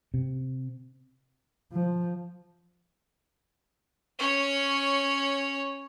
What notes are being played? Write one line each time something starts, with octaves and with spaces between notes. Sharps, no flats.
C3
F3
C#4 C#5